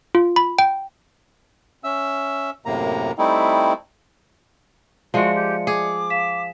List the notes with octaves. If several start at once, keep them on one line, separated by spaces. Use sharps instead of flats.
F4
B5
G5
C#4 E5 E6
F#2 A2 C3 A#3 A#5
G3 A3 C4 D#4 E4
F3 G#3 F#4 D5 E5 C#7
G4
G#4 D6
F5 B6 E7